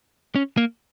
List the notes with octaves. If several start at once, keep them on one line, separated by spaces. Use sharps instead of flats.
C#4
A#3